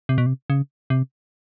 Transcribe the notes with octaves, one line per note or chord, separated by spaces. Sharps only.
C3
B2
C3
C#3
C3